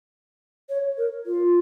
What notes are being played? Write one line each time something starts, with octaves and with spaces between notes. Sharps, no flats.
C#5
A#4
F4